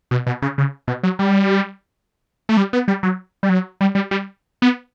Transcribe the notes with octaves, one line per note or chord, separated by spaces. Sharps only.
B2
B2
C#3
C#3
B2
F#3
G3
A3
G3
B3
G3
F#3
G3
F#3
G3
G3
G3
B3